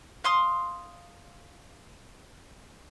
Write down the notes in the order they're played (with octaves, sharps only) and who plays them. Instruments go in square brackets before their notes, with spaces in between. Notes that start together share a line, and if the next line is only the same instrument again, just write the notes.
[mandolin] F5 C6 D#6